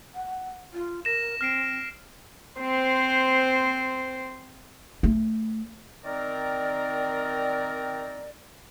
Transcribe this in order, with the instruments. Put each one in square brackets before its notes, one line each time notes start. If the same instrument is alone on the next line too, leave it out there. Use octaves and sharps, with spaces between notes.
[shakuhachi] F#5
F4
[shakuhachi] A#4 [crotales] A#6 E7
[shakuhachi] C4 [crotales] F6 C7 D7
[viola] C4 C5
[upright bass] A3
[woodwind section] D#3 C4 A#4 D5